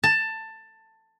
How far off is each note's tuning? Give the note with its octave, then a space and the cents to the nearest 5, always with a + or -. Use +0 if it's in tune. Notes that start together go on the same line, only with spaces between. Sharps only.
A5 +15